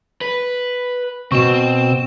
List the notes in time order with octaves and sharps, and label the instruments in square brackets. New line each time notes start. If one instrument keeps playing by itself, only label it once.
[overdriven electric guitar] B4
[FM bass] B2 [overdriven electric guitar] C4 [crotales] C#6 E7